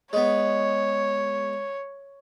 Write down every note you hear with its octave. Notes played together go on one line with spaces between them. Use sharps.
G#3 B3 C#5